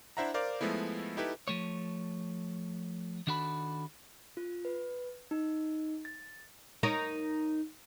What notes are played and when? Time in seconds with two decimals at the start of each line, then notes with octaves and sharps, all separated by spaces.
0.17 D4 E4 C5 E5 F#5 A#5
0.34 A#4 C5 D5 F5 D6
0.61 F3 G#3 A3 B3 E4
1.17 D#4 E4 G4 A4 B4
1.48 F3 A3 C#5
3.27 D#3 D4 F#4 A4 B5
4.37 F4
4.65 B4
5.31 D#4
6.05 A6
6.83 D#4 A#4 C#5